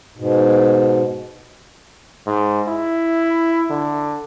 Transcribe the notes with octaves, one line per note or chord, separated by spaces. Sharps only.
G#2 B2
G#2
E4
D3